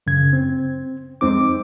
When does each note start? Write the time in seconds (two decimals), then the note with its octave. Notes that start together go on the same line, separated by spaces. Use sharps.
0.07 F#2 C#3 G#6
0.33 C4
1.21 F2 G#3 C4 D#4 D6